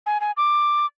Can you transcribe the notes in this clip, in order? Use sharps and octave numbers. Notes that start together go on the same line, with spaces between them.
G#5
G#5
D6